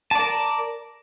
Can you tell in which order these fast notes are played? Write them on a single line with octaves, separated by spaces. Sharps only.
A5 D5 A#4